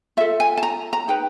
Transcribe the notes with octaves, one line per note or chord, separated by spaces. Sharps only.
F4 A4 E5
G#5
A5
A#5
A#5
D#4 G#4 B4 G5